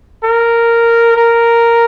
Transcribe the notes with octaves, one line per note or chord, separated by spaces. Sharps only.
A#4
A#4